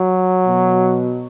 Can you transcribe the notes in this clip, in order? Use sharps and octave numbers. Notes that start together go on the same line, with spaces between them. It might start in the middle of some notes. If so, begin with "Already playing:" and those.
Already playing: F#3
B2